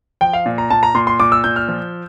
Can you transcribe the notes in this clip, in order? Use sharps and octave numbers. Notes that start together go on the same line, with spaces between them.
F3 G5
F5
A#2
A#5
A#2 A5
A#5
A#2 C6
C6
A#2 D6
E6
A#2 G6
F6
F3